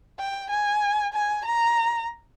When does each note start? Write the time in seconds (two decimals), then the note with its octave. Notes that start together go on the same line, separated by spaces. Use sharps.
0.19 G5
0.50 G#5
1.14 G#5
1.45 A#5